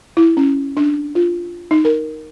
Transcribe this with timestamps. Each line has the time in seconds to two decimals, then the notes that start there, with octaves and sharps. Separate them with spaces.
0.17 E4
0.37 C#4
0.77 D4
1.15 F4
1.71 D#4
1.85 A#4